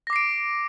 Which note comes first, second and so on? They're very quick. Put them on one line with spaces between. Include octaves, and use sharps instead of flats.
A#6 D6 C7 D7